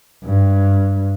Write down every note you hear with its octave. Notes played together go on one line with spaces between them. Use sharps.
G2